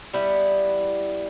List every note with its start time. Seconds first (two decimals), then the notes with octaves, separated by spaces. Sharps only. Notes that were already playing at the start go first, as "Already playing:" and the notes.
0.13 G3 B3 E4